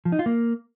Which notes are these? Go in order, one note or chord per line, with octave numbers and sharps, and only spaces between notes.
F3
D#4
F4
A#3